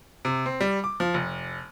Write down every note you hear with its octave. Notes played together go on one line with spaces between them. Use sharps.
C3
C4
G3
D6
F3
F1